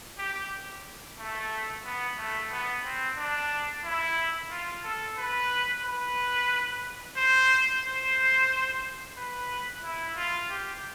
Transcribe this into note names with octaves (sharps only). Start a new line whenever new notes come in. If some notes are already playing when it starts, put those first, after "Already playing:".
G4
A3
B3
A3
B3
C4
D4
E4
F4
A4
B4
B4
C5
C5
B4
E4
F4
G4